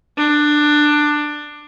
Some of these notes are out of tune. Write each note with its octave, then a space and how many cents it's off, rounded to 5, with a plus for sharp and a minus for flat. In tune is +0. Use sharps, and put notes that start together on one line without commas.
D4 +15